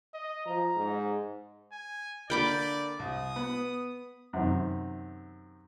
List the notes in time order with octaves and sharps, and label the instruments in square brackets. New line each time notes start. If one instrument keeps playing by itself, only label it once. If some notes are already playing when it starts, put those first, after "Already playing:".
[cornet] D#5
[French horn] F3 [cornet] A#5
[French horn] G#2
[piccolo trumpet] G#5
[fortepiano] D3 A#3 [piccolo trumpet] D5 [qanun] G5 B5 D6
[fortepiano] C2 [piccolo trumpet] D#6
[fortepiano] B3
F#2 C3 D#3